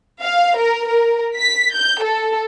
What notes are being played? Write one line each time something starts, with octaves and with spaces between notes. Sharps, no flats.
F5
A#4
A#4
B6
G6
A4